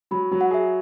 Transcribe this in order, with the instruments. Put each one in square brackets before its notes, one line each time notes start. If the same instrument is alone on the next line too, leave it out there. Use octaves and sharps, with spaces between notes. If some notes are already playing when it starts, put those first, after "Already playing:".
[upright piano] F#3 [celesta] B5
[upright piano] F#3
[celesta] F#5
[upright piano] G#4 [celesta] E5